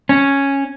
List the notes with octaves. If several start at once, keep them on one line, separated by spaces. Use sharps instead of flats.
C#4